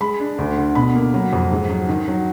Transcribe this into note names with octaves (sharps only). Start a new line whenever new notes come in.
G#3 B5
D4
D2
D3
B2 B5
A#3
F#3
F2
G#2
F#3
D#3
F#3